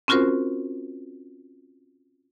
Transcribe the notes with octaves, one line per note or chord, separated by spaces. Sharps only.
C4 C#4 F4 F#4 A#4 C5